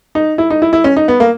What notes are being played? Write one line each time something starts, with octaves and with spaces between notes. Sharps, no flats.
D#4
E4
D#4
E4
E4
C#4
D#4
B3
A#3